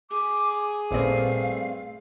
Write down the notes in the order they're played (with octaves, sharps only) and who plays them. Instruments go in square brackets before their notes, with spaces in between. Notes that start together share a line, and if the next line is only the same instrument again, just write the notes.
[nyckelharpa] G#4 [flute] D6
[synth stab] A1 A#2 [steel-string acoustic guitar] G2 A3 C4 [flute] F5